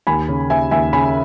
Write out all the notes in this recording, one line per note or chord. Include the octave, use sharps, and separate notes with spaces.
D#2 G#5 B5
C#3
D#2 E5 G#5
D#2 E5 G#5
C#3 G#5 B5